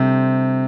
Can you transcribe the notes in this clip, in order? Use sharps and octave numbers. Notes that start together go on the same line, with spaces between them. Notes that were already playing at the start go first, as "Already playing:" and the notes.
Already playing: C3 G3 D4 A4 C5